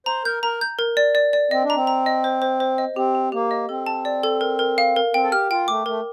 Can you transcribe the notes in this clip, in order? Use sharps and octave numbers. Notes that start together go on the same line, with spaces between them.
C5 A#5
A#4 G6
A#4 A#5
G6
A#4
D5
D5
D5
C4 D#5
D4
A#5
C4
A#5
D#5
C5
C5
C5
D#5
C4 G4
G4
A#3 G4
D#5
C4 A4
A5
D5
A4
A#4
A#4
F5
A#4
C4 G5
A4
G4 F6
F4 G5
A3 D6
A3 A#4